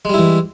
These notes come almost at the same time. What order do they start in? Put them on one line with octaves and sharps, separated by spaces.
G#3 G3 E4 E3